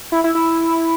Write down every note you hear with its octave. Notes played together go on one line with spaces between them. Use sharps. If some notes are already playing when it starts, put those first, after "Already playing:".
E4
E4
E4